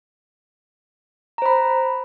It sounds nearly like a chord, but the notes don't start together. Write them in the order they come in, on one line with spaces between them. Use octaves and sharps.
A#5 C5 B5